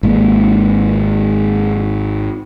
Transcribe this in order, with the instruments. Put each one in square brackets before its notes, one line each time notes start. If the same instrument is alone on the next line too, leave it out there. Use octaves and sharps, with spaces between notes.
[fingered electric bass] G#1 G#3 A#3